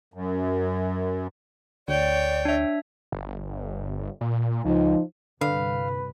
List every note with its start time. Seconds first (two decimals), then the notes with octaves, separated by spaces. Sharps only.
0.14 F#2
1.88 D2 C#5 D5 G5
2.45 D4 E5
3.12 G1
4.21 A#2
4.65 C#2 F3 D#4
5.41 C2 G2 D3 B4 F5